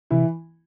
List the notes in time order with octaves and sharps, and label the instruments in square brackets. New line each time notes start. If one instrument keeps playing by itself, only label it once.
[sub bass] C3 [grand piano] E3 E4